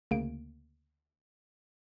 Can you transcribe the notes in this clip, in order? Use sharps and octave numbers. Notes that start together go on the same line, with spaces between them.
D2 C#3 A#3 D7